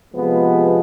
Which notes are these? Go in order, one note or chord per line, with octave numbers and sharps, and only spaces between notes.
C3 F3 G#3 B3 B4